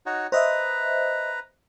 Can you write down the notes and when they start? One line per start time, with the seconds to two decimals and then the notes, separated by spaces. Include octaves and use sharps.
0.06 D#4 F#4 C#5
0.32 B4 C5 D#5 E5 A#5